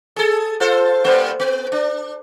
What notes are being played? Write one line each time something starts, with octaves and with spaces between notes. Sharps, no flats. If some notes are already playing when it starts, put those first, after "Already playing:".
G#4 A4
F4 A4 C5
G2 A#3 C5
B3
D4